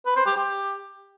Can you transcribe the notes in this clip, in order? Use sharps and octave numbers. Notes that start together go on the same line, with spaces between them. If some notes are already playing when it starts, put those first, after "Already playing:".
B4
C5
G4
G4